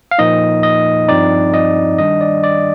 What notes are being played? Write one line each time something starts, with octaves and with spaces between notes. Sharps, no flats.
F5
A#2 F3 A#3 D#4 D#5
D#5
G2 F3 C4 D#4 D5
D#5
D#3 G3 D4 D#5
D5
D5